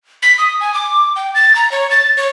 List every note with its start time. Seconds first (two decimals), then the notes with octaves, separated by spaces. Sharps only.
0.23 B6
0.38 D#6
0.61 G#5
0.74 D6
1.16 G5
1.35 A6
1.56 A#5
1.72 C#5
1.91 A6
2.17 C#5